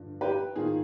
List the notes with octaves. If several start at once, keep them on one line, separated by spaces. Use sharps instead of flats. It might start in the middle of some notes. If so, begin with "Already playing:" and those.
Already playing: G2 D3 F3
G4 B4
G#2 D#3 F4 G#4